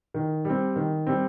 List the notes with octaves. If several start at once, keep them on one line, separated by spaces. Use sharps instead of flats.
D#3
G3 C4
D#3
G3 C4